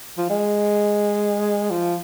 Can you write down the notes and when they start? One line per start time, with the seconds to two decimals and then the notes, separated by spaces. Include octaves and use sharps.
0.18 F3
0.30 G#3
1.71 F3